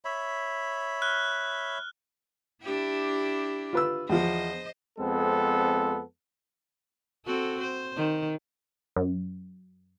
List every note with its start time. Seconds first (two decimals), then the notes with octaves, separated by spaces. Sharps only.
0.05 C#5 E5 B5
1.02 F6 F#6
2.62 D4 E4 G4
3.73 F4 B4 E6
4.09 E2 F3 C5 D#5
4.99 F2 G#3 B3 C4 A4
7.26 C4 F#4 A4
7.60 C5
7.96 D#3
8.96 F#2